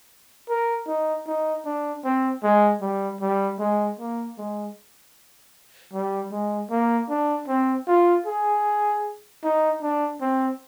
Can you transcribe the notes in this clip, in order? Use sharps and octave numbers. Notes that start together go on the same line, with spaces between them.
A#4
D#4
D#4
D4
C4
G#3
G3
G3
G#3
A#3
G#3
G3
G#3
A#3
D4
C4
F4
G#4
D#4
D4
C4